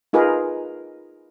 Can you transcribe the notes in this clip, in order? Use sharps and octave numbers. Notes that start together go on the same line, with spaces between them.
D#4 F4 G#4 A#4 B4